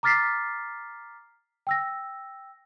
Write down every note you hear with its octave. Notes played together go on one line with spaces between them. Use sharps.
A#5 D6 F6 A6 B6 C7
G5 E6 A#6